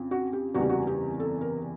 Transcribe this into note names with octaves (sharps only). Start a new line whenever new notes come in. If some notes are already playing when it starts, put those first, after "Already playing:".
Already playing: F2 C#3
F#4
G4
F#1 E2 C3 E3 G3 F#4
G4
F#4
G4
A4
A#4